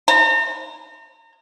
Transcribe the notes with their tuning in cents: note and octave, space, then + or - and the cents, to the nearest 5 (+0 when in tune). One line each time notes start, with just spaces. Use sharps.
A#5 -35